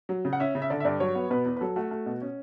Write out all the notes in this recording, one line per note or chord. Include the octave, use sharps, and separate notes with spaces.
F#3
C#3
F#5
C#4 E5
C#3
E5
D3 D5
E5
G2 D5
F#3 C#5
B3
B2 B4
E2
B4
F#3 A4
A3 F#4
A3
B2
C#4